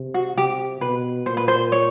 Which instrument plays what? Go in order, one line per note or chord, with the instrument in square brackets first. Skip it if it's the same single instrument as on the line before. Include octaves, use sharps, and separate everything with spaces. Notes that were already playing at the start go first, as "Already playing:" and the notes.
Already playing: [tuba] C3
[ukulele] F#4
[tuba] C3 [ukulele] G4
[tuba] B2 [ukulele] B4
[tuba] A#2 [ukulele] C5
[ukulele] B4
C5
C#5